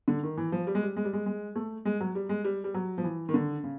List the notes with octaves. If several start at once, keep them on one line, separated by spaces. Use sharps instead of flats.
D3
D#3
E3
F3
G3
G#3
G3
G#3
G3
G#3
G#3
A3
G#3
F#3
G3
G#3
G3
G3
F#3
F3
E3
D#3
D3
C#3